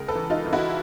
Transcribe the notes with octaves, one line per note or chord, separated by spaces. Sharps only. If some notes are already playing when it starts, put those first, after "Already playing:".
Already playing: C#2 G#4 A#4
A4 B4
E3
D#4 F4
E3
E4 F#4